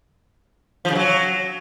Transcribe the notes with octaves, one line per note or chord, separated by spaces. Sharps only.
F3
C#3
F#3